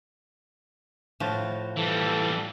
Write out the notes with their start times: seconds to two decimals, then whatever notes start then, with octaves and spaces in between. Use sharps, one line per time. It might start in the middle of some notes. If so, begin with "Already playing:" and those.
1.20 A2 F3 F#4
1.76 E3 G3 A4